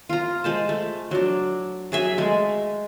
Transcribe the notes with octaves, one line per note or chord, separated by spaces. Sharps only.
F4 A#5
G#3 C5 A5
A3
F#3 D4
F#3 G#4 E5
G#3 A3